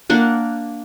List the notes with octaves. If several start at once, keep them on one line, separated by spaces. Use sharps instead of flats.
A#3 D4 F#5